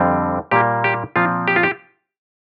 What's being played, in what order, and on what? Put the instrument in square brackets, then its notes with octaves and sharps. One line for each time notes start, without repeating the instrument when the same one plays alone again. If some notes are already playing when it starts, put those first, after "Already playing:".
Already playing: [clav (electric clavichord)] F2 D3 G3 C4
A#2 G3 A#3 G4
G4
A#2 F3 C4 F4
G4
F4
G4